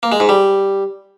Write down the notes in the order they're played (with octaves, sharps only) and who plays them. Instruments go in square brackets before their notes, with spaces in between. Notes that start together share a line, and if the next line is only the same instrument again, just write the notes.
[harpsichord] A#3
G#3
G#2
G3